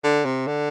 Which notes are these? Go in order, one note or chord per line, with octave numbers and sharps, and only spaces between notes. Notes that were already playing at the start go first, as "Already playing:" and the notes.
D3
C3
D3